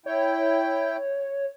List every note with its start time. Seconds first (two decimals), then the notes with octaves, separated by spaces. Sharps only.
0.06 E4 C#5 G5